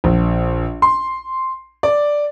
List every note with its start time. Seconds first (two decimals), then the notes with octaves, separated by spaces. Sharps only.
0.04 A#1
0.82 C6
1.83 D5